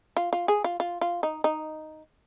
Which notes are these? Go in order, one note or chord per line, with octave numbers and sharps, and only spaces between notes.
F4
F4
G#4
F4
F4
F4
D#4
D#4